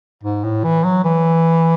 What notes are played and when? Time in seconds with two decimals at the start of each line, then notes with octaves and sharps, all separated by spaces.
0.24 G#2
0.44 A2
0.64 E3
0.84 F#3
1.04 E3